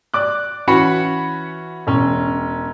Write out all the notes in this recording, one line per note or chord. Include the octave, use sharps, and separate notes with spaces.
D5 D6 F#6
E3 C#4 F#4 B5 C#7
E1 C#4